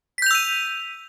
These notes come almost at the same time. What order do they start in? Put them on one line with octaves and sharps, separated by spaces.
B6 G6 F7 E6 D#7